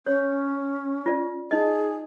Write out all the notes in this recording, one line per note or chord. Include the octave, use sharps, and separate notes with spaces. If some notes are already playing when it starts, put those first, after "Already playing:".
C#4 C#5
F4 D5
D#4 G#4 D#5